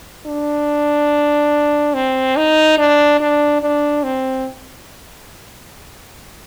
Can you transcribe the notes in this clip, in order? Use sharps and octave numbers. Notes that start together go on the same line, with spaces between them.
D4
C4
D#4
D4
D4
D4
C4